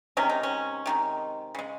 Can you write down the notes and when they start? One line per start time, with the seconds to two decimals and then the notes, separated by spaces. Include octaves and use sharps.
0.17 C3 D#3 G#3 C#4
0.29 D#4
0.43 C#4
0.86 C3 D#3 G#3
1.55 C#3 G#3